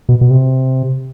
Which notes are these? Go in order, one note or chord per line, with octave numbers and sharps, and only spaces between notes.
B2
B2
C3